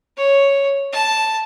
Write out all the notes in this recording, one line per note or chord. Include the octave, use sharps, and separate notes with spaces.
C#5
A5